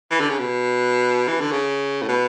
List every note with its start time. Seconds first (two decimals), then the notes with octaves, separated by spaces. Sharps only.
0.11 E3
0.20 D3
0.30 C#3
0.39 B2
1.28 E3
1.40 D3
1.52 C#3
2.02 A2
2.09 B2